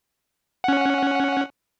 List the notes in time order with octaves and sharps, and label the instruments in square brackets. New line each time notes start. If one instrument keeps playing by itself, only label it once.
[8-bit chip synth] C#4 F#5